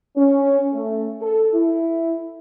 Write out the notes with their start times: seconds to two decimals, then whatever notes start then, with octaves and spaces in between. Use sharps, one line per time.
0.16 C#4
0.72 A3
1.21 A4
1.54 E4